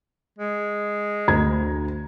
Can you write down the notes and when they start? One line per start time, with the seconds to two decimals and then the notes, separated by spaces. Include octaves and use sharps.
0.38 G#3
1.28 D2 A#5 G#6